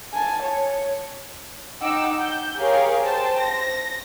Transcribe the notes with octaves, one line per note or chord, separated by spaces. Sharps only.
G#5 A5
C#5
D#4 F#5 G5 D6 E6
G6
G4 G#4 A#4 C#5 F5
C5 G5 A5
A#6